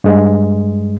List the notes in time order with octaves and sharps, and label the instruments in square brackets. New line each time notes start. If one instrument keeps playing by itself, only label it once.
[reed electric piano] G2 G#3